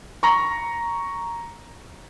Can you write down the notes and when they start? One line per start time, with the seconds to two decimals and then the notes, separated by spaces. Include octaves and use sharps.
0.23 A#5 C#6